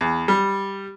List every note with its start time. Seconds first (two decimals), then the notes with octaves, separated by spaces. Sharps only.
0.01 E2
0.28 G3